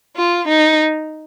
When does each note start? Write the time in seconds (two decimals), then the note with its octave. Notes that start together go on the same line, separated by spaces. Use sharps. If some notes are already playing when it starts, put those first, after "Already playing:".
0.16 F4
0.48 D#4